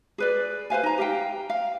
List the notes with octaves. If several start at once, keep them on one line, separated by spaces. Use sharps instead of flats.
G#4 B4 D5
B4 C5 F5 G#5
D#4 A#5
G4 F5 G5
F5